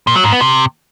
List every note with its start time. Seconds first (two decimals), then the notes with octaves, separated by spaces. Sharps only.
0.07 A#2
0.15 F#3
0.24 G#2
0.32 B3
0.41 C3